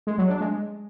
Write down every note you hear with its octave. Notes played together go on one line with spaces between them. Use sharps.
G#3
F#3
D4
G#3